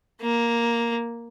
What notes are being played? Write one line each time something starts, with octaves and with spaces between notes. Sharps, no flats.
A#3